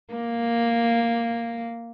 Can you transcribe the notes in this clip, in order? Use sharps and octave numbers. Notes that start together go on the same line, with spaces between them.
A#3